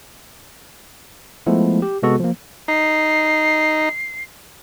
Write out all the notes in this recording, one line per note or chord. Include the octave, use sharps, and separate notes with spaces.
F3 G#3 A3 B3 E4
G4
C3 G#3 B3 F#4 A4
F3 A#3
D#4 C7